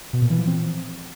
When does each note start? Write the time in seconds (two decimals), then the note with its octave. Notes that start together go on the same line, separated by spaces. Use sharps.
0.13 B2
0.22 A#2
0.30 E3
0.39 F3
0.47 C4